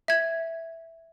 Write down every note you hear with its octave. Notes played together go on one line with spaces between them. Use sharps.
E5 G#6